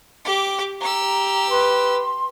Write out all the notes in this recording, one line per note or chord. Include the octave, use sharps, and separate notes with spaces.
G4 D6
G4 A#5 E6
B4 C6